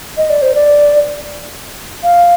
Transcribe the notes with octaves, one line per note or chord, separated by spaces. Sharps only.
D#5
D5
C5
D5
F5